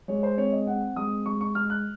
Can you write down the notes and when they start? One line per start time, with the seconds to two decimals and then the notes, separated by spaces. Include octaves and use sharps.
0.08 G#3 C#5
0.23 C5
0.37 C4 C#5
0.53 D#5
0.67 C4 F#5
0.96 G#3 D#6
1.26 G#3 C#6
1.41 C#6
1.55 G#3 F6
1.70 F#6